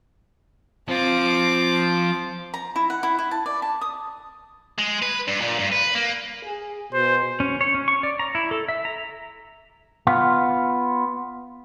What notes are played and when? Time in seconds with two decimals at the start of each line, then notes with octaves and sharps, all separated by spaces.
0.89 F3 C4 F4 D6
2.54 A#5
2.76 E4
2.90 F#5
3.03 E4
3.19 E4
3.31 A5
3.46 D5
3.62 A5
3.81 D#6
4.78 G#3
5.02 B4
5.28 G2
5.40 A#2
5.59 G2
5.72 B4
5.95 A#3
6.45 G#4
6.93 B2 C5
7.40 C#4
7.61 C#5
7.74 C#4
7.88 C#6
8.03 D5
8.19 A#5
8.35 E4
8.51 A4
8.68 E5
8.85 A#5
10.07 B3 F4